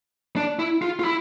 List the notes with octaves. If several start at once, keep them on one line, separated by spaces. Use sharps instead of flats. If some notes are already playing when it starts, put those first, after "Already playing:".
D4
E4
F4
F4
E4